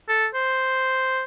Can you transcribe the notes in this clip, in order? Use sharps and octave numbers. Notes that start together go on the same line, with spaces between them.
A4
C5